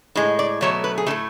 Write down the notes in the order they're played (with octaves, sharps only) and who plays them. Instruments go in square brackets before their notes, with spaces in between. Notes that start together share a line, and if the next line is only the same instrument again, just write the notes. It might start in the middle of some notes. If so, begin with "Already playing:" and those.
[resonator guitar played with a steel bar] A2 G#3
D5
B2 F#3 A3 C#5
B4
G#4
A2 E3 A3 A4